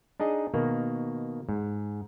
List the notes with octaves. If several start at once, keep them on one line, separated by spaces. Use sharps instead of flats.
D4 D#4 G#4 D#5
B2 D#3 A#3
G#2